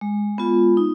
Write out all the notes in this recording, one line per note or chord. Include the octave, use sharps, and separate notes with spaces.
G#3
B3 F4
D#4